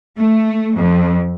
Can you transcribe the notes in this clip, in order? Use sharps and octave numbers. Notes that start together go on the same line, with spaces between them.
A3
F2